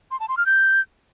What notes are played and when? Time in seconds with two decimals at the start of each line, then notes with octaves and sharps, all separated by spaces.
0.11 C6
0.20 A5
0.29 C6
0.37 F6
0.46 G6